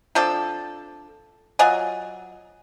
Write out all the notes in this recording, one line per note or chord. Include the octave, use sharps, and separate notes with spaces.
F3 C4 D4 A4
F#3 F4 D#5 G#5